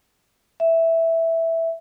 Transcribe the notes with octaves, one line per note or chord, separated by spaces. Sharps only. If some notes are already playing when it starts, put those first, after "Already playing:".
E5